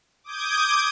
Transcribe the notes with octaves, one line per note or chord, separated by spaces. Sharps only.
D6 D#6 G6 G#6